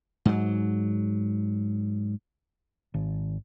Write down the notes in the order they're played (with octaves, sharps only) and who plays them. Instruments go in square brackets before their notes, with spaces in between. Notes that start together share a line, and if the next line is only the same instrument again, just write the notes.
[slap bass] G#2 F#3
[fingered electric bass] G#1